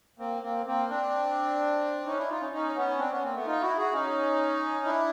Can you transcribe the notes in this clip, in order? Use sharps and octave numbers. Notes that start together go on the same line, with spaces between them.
A#3 C4
A#3 C4
A#3 C4
C4 D4
C#4 D#4
D4 E4
D#4 F4
C#4 D#4
C#4 D#4
B3 C#4
C4 D4
B3 C#4
A#3 C4
A3 B3
D#4 F4
E4 F#4
F#4 G#4
C#4 D#4
D4 E4